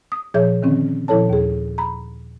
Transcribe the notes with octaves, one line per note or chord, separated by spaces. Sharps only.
D#6
A#2 F3 G#4 C#5 E5 G6
D3 D#3 C4 C#4
A#2 F3 E4 A4 C#5 A5
D#2 G#4
A#5 B5